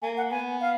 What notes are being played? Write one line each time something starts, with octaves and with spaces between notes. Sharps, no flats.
A#3 G#5
F#5
B3 G#5
F5